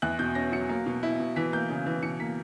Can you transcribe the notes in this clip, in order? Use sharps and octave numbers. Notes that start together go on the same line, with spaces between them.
E2 F#6
B2 G6
C#4 A#6
F#3 C#7
A#3
B2
E4
B2
E3 B6
A#3 G6
C#3
E3
B2 C#7
A#3 B6